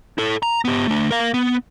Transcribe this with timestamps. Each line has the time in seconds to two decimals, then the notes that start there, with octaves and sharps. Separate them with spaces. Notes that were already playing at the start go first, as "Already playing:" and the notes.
0.18 E4 A4
0.43 A#5
0.65 B3 G4
0.88 A3 D4
1.11 A#4 F5
1.34 B3